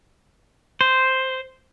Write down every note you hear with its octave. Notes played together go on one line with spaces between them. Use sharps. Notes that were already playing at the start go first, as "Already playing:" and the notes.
C5